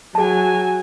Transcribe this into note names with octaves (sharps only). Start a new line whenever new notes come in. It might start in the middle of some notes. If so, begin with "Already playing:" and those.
F#3 G#4 G#5 A5